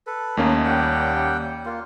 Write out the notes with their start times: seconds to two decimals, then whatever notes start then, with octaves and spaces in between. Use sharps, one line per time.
0.07 A4 B4
0.37 D#2 A3 A#3 C#4 D#4
0.65 G3 F#5 G5
1.66 A#3 F4